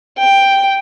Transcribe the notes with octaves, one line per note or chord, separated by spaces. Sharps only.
G5